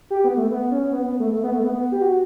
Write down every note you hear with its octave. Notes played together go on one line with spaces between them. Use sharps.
G4
B3
A3
B3
C#4
B3
B3
A3
A3
B3
A3
B3
B3
G4
F#4